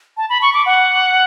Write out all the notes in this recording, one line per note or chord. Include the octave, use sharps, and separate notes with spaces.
A5
B5
C#6
D6
F#5